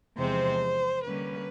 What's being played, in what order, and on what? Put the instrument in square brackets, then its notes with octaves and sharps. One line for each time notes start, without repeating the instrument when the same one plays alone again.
[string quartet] E2 C3 F3 G#3 C4 C5
D3 G3 A#3 C#4 B4